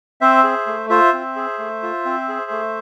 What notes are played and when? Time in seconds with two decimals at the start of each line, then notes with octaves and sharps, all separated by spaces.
0.21 C4 C5 E5
0.44 G#4
0.67 A3
0.89 F4 C5 E5
1.13 C4
1.36 G#4
1.59 A3
1.83 F4
2.05 C4
2.29 G#4
2.51 A3